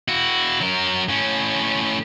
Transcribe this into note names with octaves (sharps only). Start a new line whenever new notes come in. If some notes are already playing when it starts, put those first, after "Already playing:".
E4 F#4
F#3 A#4
A2 C#4